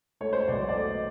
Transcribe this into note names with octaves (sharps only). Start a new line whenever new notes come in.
A3 C#5
C5
C#5
B1 D5
D5
A3 D#5